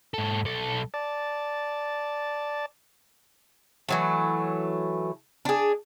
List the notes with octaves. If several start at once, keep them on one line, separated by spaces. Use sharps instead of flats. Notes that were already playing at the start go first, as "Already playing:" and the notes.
G#2 A4
B1 A4
D5 A5
E3 F#3 A3
D4 G#4